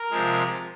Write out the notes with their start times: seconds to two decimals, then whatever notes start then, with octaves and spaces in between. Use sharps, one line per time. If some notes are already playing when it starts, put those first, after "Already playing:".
Already playing: A#4
0.10 C3 F3 G#3